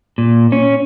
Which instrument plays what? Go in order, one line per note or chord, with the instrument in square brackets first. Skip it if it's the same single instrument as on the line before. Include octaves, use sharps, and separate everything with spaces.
[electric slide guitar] A#2
C#4